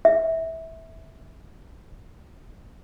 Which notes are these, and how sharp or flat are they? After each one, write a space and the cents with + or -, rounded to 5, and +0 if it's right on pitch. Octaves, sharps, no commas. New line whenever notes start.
E5 -15